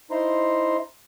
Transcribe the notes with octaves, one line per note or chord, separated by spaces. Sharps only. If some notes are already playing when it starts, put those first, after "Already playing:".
D#4 E4 C5 A#5 C6